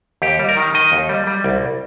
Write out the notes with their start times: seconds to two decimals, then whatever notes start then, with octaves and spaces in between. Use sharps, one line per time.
0.22 D#2 G4
0.39 G3
0.49 A#4
0.57 D#3
0.74 D#3 D#5
0.92 D#2
1.09 G3
1.27 G3
1.44 C2